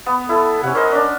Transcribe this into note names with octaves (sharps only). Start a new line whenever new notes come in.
B3
E4 A4
C3 C#4 F#5
C#4 A#4 C5 D#5
C#4 D4